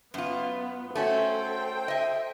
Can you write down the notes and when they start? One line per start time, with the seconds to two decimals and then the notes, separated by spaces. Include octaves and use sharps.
0.14 F#2 B3 F4
0.95 A3 C#4 F#4 A4 C5 G5
1.88 D#5 E5